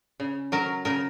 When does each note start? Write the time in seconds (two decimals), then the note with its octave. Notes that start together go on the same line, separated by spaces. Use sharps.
0.20 C#3
0.52 F#3 A#4
0.85 C#3 A#4